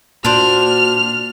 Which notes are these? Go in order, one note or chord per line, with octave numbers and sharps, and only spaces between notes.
A#2 D4 F#4 C5 F6